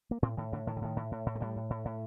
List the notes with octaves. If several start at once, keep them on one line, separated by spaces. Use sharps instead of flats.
A#3
A2 C4
A2 D#3
A2 D3
A2 D#3
D3
A2 D#3
A2
A2
A2
A3
A2 G3
A2
A2
A2